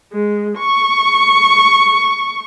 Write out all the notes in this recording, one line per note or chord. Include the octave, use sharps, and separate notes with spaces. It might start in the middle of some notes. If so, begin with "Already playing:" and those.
G#3
C#6